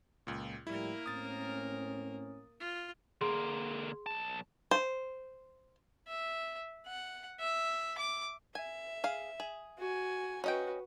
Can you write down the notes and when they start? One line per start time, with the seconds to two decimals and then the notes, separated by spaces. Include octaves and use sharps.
0.27 C#2 A#2
0.67 A2 F3 G3 A#3 E4 A#4
1.06 A2 C4 C#4 D#6 A6
2.60 F4
3.21 D3 A#3 G#4 C6
4.06 B1 A5
4.71 C5
6.08 E5
6.87 F#5
7.40 E5
7.98 D6
8.55 E5 G#5
9.04 G#4 F5
9.40 G#4
9.79 F#4 G#5
10.44 C#4 F#4 B4 D#5 G5